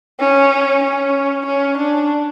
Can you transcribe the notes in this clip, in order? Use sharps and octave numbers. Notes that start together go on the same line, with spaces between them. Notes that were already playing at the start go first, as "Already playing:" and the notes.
C#4
C#4
C#4
D4